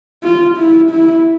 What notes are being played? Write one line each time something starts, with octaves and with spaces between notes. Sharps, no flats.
F4
E4
E4